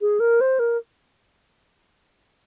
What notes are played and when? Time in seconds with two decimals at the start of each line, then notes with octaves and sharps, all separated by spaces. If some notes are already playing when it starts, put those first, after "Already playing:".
0.01 G#4
0.20 A#4
0.41 C5
0.59 A#4